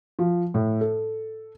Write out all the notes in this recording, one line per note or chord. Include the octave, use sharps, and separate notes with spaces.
F3
A2
A4